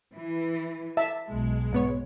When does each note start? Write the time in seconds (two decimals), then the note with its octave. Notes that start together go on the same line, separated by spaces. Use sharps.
0.15 E3
0.97 E5 A5
1.27 B1 G#3
1.72 G#2 B3 C#5